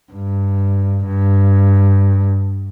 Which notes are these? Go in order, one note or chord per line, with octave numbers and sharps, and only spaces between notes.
G2
G2